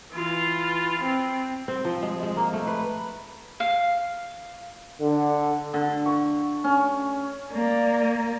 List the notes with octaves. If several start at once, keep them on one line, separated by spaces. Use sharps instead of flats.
E3 F4
C4
C4
F3
G#3
G#3
A#3
A3
B4
F5
D3
D3
C#6
C#4
A#3 D5